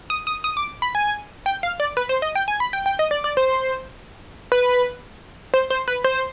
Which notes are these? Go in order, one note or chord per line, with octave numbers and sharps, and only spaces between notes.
D#6
D#6
D#6
D6
B5
G#5
G5
F5
D5
B4
C5
D#5
G5
G#5
B5
G5
G5
D#5
D5
D5
C5
B4
C5
C5
B4
C5